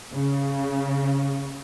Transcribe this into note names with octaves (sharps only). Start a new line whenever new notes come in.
C#3